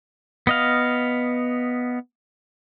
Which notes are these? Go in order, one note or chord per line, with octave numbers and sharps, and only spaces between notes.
B3 D#5 F5